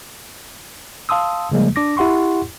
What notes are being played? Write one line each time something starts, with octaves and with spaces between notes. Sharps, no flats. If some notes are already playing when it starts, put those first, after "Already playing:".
F5 A5 C6 D#6 E6
C#3 F3 G3 G#3 A#3
D4 D6 A#6
E4 G4 F#5 C6 C#6